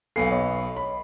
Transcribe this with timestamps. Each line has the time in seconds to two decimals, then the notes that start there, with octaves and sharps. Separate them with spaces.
0.16 B1 B3 A4 F5 G#5 C7
0.31 C#5 D#5
0.77 B5